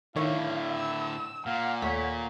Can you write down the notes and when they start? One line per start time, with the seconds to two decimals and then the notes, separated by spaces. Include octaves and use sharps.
0.16 A2 D3 D#3 E4 C#5 F5
0.75 E6
1.46 A#2 F5 F#5
1.82 D#2 A3 C#5 B6